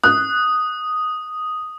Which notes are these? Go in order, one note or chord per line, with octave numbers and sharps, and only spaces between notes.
D#6 F#6